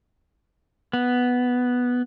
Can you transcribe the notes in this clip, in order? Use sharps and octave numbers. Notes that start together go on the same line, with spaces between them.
B3